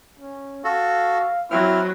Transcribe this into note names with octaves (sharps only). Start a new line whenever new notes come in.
C#4
F#4 A4 F5
F#3 C4 E4 F6